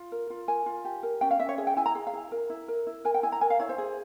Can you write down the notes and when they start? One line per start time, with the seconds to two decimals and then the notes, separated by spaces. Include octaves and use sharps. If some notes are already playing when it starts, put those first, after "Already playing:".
Already playing: F4
0.12 A#4
0.30 F4
0.48 A#4 G#5
0.66 F4
0.85 G4
1.03 A#4
1.21 C#4 G5
1.31 F5
1.40 C#4 E5
1.49 C#5
1.58 G#4 E5
1.67 G5
1.77 E4 G#5
1.86 A#5
1.95 G#4
2.07 F5
2.13 E4
2.32 A#4
2.50 E4
2.68 A#4
2.87 E4
3.05 A#4 G#5
3.14 G5
3.23 E4 G#5
3.32 A#5
3.41 A#4 G#5
3.50 F5
3.60 E4 C#5
3.69 C5
3.78 G#4